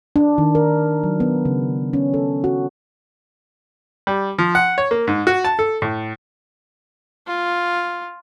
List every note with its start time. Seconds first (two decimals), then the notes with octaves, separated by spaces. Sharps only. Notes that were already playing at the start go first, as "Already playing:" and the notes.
0.16 D4
0.38 D#3
0.55 A#4
1.03 F#3
1.20 B3
1.45 C#3
1.93 C#4
2.14 A4
2.44 F#4
4.07 G3
4.39 F3
4.55 F#5
4.78 C#5
4.91 A#3
5.07 G#2
5.27 F#4
5.45 A5
5.59 A4
5.82 A2
7.27 F4